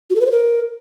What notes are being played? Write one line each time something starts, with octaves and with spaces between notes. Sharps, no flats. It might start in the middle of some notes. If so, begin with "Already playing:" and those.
F#4
A4
B4
C5
A#4